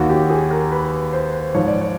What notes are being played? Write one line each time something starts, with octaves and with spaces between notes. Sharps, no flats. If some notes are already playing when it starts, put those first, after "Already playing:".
Already playing: D#2 D#3 F#4
G4
G#4
A#4
B4
C5
G#2 F3 C#5
D5
C#5